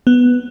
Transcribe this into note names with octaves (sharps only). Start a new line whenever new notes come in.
B3